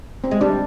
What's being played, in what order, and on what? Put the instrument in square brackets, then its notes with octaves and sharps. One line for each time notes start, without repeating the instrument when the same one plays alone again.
[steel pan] C4
[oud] G#3
[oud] G3 [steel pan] D4